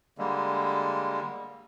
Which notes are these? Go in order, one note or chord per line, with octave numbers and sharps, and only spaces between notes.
D3 G3 G#3 A#3